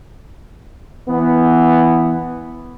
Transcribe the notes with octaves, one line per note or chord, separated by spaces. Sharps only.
E3 B3